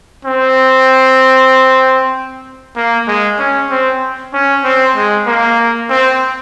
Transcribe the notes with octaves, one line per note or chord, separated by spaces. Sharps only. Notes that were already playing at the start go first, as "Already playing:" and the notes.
C4
A#3
G#3
C#4
C4
C#4
C4
G#3
A#3
C4